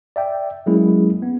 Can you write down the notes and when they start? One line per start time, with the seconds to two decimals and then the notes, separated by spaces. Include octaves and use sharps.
0.16 D5 E5 G5
0.66 F#3 G#3 A#3 C#4 E4 G#4
1.22 B3